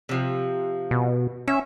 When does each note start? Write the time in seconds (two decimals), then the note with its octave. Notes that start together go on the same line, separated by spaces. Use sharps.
0.09 C3 F3
0.91 B2
1.48 C#4 E5